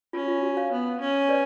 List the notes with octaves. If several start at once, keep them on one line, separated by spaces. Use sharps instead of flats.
C#4 F4
F4
F#4
C#5 F5
B3
C#4
B4 D5